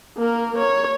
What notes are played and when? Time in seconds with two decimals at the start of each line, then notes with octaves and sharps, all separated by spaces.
0.18 A#3 A#4
0.58 C#5